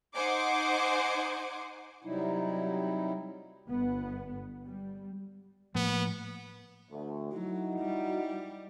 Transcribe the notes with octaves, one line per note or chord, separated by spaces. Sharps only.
D#4 C5 F#5 G#5 C6 D6
C3 F#3 G3 D#4 E4
G1 B3
G3
A2 F3 A#3 B3
D2
F#3 D#4 E4 F#4
G3